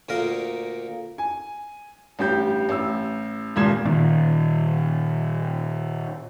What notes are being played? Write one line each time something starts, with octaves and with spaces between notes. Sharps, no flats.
D2 A#2 A#3 A#4 F5
G#5
A1 G2 G4 G6
A1 E6
D#1 G#1 C#2 A#2 G#6 E7
A#2 D#3